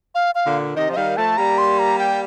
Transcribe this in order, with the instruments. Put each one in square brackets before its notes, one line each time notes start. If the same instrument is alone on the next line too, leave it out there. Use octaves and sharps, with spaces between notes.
[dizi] F5
F5
[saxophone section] A#2 D3
[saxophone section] C3 D#3 [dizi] D#5
[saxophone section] F3
[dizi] D#5
[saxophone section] D#3 G3 [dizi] F5
[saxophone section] F3 A3 [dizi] A5
[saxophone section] G3 A#3 [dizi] A#5
[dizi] C6
A#5
G5